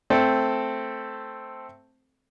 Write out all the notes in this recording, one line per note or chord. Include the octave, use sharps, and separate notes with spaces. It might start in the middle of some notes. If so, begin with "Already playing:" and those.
A3 C4 A4